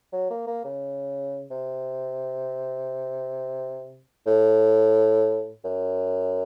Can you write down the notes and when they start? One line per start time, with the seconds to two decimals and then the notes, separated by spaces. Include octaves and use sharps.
0.12 F#3
0.30 A#3
0.47 A#3
0.64 C#3
1.51 C3
4.26 A2
5.64 F#2